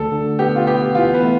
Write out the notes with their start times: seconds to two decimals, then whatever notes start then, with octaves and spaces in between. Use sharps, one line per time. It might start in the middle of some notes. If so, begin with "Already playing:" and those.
Already playing: D2 A4
0.12 D3
0.39 B3 G4
0.56 F4
0.67 B3 G4
0.95 E3 F4
1.14 B3
1.23 A3